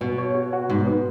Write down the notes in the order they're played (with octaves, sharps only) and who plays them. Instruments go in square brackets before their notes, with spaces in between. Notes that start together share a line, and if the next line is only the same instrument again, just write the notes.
[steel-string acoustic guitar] B2 [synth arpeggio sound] B3
[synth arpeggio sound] C#5
F#4
F#4
[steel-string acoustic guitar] G#2 [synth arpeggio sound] B2
[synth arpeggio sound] B3